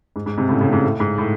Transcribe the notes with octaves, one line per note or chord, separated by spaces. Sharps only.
G#2
G#2
G#2 C3
A2 C#3
A2 C#3
G#2 C3
A2
G#2
A2